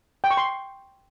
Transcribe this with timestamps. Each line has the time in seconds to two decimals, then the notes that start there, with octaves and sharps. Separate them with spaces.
0.24 G5
0.31 C#6
0.37 C6